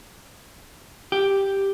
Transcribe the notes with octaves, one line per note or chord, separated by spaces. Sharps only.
G4